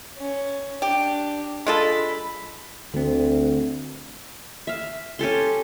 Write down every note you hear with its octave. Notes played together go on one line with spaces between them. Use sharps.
C#4
D4 G4
G#3 F4 A4 B5
D2 D3 C4
E5 F5
C#4 G4 A4 C6